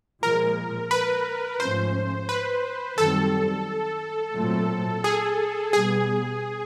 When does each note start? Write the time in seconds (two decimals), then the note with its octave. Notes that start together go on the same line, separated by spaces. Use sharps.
0.22 A#2 F3 G#3 A#4
0.91 B4
1.60 G#2 F3 A3 C#4 C5
2.29 B4
2.97 F#2 D#3 G3 C4 A4
4.35 A#2 F#3 A3 C4
5.04 G#4
5.72 B2 G3 B3 G#4